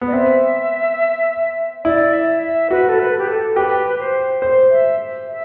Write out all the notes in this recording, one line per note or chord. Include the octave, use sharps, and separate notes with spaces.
B3
D5
C4 E5
E4 D5
E5
E5
F#4 B4
A4
B4
G4
A4
G4 B4
C5
C5
E5
E5